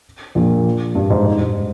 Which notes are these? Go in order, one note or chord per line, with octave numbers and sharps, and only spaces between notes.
A#1 A#2
G2
G#2
G#2
G#2